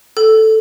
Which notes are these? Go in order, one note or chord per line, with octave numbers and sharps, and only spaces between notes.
A4